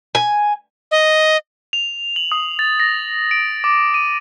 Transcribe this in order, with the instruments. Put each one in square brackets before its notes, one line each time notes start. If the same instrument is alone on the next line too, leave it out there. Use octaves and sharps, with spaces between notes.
[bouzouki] G#5
[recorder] D#5
[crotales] F7
F#7
D#6
A6
A#6
D7
D6
D#7